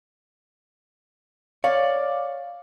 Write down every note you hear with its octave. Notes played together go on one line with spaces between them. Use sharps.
C#5 D5 F5